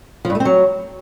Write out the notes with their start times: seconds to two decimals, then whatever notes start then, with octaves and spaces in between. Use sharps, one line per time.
0.25 F3
0.30 G2
0.35 A3
0.40 C4
0.45 F#3